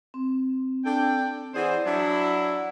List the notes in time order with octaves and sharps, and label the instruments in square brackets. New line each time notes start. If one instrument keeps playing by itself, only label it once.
[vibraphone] C4
[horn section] D4 A4 G5
[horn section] E3 G#4 C5 [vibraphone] D5 F#5
[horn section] F#3 D4 E4